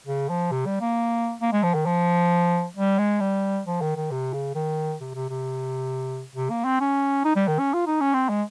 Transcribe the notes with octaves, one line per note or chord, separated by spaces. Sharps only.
C#3
F3
C3
G3
A#3
A#3
G#3
F3
D#3
F3
G3
G#3
G3
F3
D#3
D#3
C3
C#3
D#3
C3
C3
C3
C3
A#3
C4
C#4
D#4
G3
D#3
C#4
F4
D#4
C#4
C4
G#3